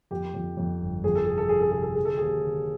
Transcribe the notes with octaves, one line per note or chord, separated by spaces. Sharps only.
F2 G4
F2
F2
G1
F2 G#4
A4
C3 G#4
A4
C3 G#4
A4
C3 G#4
A4
D3 G#4
A4
D#2 G#4
D3